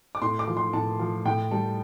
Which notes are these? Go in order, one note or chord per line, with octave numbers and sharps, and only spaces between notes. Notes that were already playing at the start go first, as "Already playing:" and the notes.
D6
A2 C6
D6
F3
C6
A2 A5
F3
A2 G5
G3 A5